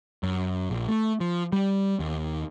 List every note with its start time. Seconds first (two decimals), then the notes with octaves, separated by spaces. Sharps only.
0.23 F#2
0.70 A#1
0.89 A3
1.20 F3
1.53 G3
1.99 D#2